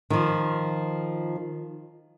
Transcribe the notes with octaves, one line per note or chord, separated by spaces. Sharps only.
D#3 F3